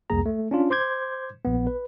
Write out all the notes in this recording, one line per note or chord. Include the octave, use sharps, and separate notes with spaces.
C2 F2 A#3 G#4 A#5
A3
C#4 D4 F4
C5 C6 D6 G6 G#6
A#1 B3
B4